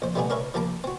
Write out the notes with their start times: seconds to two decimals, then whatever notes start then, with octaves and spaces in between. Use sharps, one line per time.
0.02 A#1 C5
0.15 G3 A3 B3 D4 G4 G#4
0.30 D4 A#4 B4 C#5 E5
0.54 F3 A#3 G4 A5 B5 D6
0.84 C4 F#4